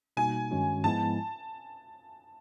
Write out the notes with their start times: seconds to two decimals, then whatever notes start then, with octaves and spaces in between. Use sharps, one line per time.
0.17 B2 G3 A#3 D#4 F#4 G#5
0.51 G2 D#3 G#3 C#4 F#4
0.84 G#2 F3 G#3 B3 E4 A5